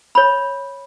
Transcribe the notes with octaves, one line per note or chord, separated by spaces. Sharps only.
C#5 B5